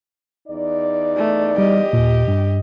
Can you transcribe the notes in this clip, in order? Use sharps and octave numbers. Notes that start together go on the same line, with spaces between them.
E2 D#4 D5
A3
G3 G4 D#5
D#2 A#2
G2